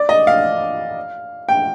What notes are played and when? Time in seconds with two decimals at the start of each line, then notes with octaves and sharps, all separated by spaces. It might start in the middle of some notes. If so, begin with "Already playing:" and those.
Already playing: D5
0.09 D#5
0.27 F5
1.49 G5